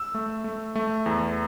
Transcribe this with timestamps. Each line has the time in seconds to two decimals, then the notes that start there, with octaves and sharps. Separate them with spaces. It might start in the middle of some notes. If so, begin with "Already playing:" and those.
Already playing: E6
0.14 A3
0.44 A3
0.75 A3
1.06 E2